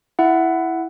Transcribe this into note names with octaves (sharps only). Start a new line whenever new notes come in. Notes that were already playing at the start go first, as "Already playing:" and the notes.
E4 E5 F#5